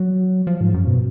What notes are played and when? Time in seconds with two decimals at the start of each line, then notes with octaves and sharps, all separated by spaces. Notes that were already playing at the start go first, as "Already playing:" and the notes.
Already playing: F#3
0.47 F3
0.61 G#2
0.74 F#2
0.87 B2